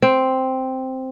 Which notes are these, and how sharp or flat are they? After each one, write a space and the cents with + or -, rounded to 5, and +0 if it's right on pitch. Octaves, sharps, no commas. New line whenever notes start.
C4 +0